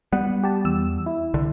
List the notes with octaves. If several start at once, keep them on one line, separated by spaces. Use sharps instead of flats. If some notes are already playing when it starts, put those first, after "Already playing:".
G3 B3 F#5
G4 A5
E2 E6
E4
C2 D3